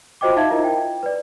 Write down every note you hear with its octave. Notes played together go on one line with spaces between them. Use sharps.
F4 F#4 C5 D#5 G5 D6
D#4 E5 F5 A5 G#6
E4 F4 A#4 D#5
G5
B4 D5